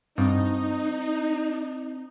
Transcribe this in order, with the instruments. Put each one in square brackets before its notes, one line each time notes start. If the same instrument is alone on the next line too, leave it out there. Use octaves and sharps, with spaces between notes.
[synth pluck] G2 [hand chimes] C4 [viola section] D#4